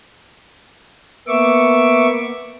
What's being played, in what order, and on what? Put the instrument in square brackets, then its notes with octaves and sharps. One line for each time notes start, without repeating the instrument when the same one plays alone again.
[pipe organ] A#3 B3 E5 C#6 D6